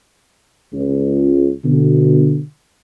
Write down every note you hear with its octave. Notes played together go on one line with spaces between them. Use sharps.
C#2
B2 D3